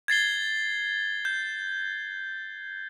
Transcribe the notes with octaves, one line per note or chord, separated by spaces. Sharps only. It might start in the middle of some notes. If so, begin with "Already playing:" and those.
G#6 A6 C7 G7
G6